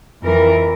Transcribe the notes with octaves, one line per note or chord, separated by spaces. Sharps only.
F2 E3 A#4